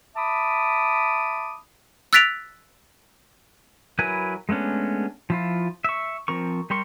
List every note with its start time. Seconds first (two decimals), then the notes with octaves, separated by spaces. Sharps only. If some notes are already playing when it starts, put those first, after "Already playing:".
0.16 E5 A5 B5 D6 D#6
2.13 E6 F#6 A6 B6 D7 F7
3.99 F#3 E4 A#4 B4 G#5
4.49 G#3 A3 B3 C#4 D4
5.30 F3 E4 F4
5.84 E5 C#6
6.28 F3 C4 A#4 C#6
6.70 G3 G4 A#4 C6 C#6